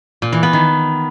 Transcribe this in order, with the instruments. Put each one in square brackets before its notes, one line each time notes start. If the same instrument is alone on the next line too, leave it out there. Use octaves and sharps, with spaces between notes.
[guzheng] A#2
E3
B3
D#3